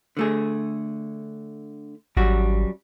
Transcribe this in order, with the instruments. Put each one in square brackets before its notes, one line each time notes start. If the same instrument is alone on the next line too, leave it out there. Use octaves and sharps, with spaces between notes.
[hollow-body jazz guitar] D3 A3 G#4
[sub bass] G#1 [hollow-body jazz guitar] F#2 G3 F#4